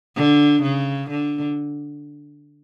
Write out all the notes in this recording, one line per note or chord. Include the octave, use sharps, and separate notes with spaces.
D3
C#3
D3